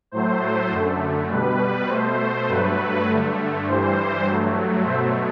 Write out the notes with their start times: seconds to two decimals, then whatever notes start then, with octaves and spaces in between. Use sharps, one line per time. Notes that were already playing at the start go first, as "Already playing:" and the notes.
0.11 A2 F#3 A3 C5
0.71 F#2 D3 A3
1.30 B2 G3 B4
1.88 B2 A3 C5
2.48 G2 F#3 A3 B4
3.07 G2 D3 A3
3.66 G2 E3 G3 C5
4.25 G2 F#3 A3
4.84 B2 F#3 A3 C5 E5